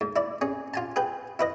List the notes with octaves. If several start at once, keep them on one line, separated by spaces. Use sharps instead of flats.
G#2
E4 D5
C#4 G#4
F4 G#5 A5
G#4 B4 G5
E4 B4 D#5